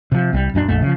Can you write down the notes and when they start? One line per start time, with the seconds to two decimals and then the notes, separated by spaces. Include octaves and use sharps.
0.12 C3 F3
0.33 C2 G3
0.54 D#1 F#2 A3 D4
0.68 A#1 F2 A3
0.82 C#3 F3